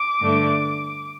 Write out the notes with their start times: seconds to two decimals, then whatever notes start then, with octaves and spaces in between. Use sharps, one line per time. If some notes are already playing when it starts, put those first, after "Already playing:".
Already playing: D6
0.19 G2 D3 A3 D4